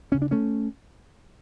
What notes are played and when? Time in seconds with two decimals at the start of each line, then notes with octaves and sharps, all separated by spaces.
0.12 D2 C#3 C#4
0.22 D4
0.31 A3 C#4